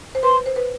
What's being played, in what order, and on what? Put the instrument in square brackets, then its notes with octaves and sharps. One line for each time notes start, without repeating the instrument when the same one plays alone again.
[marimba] C5
[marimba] B4 [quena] C6
[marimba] C5
B4